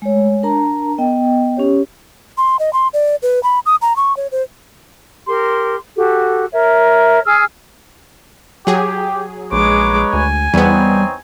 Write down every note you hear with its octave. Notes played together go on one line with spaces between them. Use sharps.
G#3 A3 C#5
D4 A#4 A5 A#5
B3 D#5 G5
C#4 G4 C#5
C6
D#5
C6
D5
B4
B5
D#6
A#5
C#6
C#5
C5
G4 A#4 C6
F#4 G4 A4
A#4 C#5 E5
G#4 G#5 E6 F6
F#3 G4 G#4
A#1 G#3 D#4 B4 C#5 D6
D2 G#5
E2 G3 B3 C4 D#4 C#5